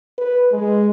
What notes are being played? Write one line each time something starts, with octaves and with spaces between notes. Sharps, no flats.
B4
G#3